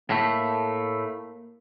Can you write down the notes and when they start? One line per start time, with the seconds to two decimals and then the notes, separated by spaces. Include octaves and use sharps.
0.10 A2 A3 A#3